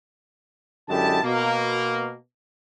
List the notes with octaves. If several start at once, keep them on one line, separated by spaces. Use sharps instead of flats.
F#2 D3 G#3 E4 G4 A5
B2 A#3